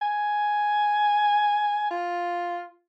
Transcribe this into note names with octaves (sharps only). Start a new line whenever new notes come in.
G#5
F4